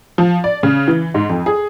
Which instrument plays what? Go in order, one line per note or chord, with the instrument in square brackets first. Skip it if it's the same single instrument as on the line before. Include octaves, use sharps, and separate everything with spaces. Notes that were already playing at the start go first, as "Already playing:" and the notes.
[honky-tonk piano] F3
D5
C#3
E3
G#2
F2
G#4